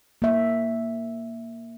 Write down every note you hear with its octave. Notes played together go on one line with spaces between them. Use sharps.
A#3 E5